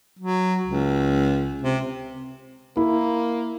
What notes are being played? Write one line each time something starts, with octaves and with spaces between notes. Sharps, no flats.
F#3
C#2
C3
A#3 E4